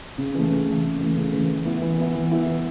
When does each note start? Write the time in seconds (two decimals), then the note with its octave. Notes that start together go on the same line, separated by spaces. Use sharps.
0.18 C#3
0.35 E3 A3
0.51 C#3
0.67 E3 A3
0.84 C#3
1.00 E3 A3
1.16 C#3
1.33 E3 A3
1.49 E3
1.65 B3 E4
1.82 E3
1.98 B3 E4
2.15 E3
2.31 B3 E4
2.47 E3